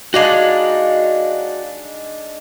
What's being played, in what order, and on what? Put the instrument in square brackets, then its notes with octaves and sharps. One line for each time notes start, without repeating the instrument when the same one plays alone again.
[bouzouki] G#3 D4 D#4 [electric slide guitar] F#4 F5